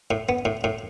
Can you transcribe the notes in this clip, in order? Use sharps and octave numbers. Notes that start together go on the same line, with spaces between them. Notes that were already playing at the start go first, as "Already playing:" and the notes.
A2
B3
A2
A2